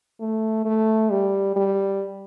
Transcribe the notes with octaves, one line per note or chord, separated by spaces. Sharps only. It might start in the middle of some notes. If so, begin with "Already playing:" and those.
A3
A3
G3
G3